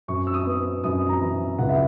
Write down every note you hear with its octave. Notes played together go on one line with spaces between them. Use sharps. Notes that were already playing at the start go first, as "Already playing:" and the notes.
F#2 C#6
E6
D#6
B3
F#2 D#6
A#5
E3
C#2 F#5
E5